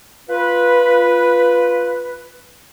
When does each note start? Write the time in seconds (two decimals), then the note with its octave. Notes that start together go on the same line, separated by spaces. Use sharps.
0.29 F4 B4